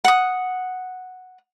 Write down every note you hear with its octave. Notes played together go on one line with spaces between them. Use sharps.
F#5 D#6